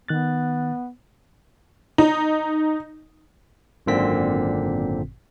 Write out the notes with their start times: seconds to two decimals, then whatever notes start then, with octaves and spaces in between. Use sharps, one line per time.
0.08 D#3 B3 F#6 A6
1.98 D#4
3.86 G#1 F#2 A#2 D3 C4 B6